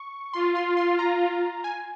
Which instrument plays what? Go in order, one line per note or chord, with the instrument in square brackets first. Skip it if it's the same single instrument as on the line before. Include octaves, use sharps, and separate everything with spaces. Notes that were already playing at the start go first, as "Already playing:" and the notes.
Already playing: [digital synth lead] C#6
[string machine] F4 [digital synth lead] C6
[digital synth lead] C6
C6
A#5
G#5